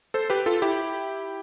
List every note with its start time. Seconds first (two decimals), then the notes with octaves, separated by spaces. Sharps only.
0.14 A4 C5
0.30 G4 B4
0.46 F4 A4
0.62 E4 G4